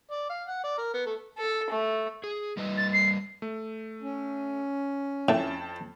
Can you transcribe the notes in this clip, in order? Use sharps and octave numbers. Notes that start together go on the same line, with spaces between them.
D5
F5
F#5
D5
A#4
B3
A3
A4
A3
G#4
G3 B4 D#5
A6
C7
A3
C#4
F2 A2 G5 A5